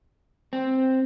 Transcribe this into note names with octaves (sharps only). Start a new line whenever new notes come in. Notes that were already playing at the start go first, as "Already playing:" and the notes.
C4